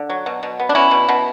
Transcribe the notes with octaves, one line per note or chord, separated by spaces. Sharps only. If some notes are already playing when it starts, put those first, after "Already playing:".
Already playing: D3
F#3
B2
B2
B3
D4
F#3 C#4 E4
B2
B2